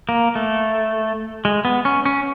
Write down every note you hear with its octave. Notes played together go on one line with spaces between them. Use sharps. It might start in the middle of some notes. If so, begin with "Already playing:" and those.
A#3
A3
G#3
B3
C#4
C#4